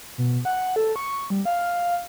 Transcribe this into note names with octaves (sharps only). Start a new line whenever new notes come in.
B2
F#5
A4
C#6
G3
F5